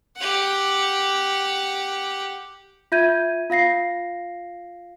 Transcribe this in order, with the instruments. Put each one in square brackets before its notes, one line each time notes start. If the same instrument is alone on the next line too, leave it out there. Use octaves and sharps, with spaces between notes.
[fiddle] G4 F#5
[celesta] F4 E5 G6 G#6 D#7
F4 F5 A#6 C7